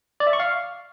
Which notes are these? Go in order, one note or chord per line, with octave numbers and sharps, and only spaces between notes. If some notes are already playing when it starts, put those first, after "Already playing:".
D5
E5
C#6
F5